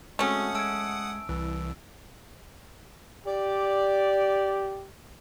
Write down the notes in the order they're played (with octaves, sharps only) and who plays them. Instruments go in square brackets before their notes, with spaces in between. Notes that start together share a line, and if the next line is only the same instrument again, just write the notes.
[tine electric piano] G#3 C4 F#4 [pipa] A3 C#4 [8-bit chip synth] F#5 D#6
[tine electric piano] G#3 G#6 [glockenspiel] A5 E6 D7
[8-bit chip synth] C2 [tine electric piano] E3
[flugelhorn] G4 [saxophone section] D5